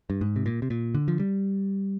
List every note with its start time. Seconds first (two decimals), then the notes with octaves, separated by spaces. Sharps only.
0.10 G2
0.21 G#2
0.36 C3
0.46 A#2
0.62 C3
0.70 A#2
0.95 D3
1.08 F3
1.19 G3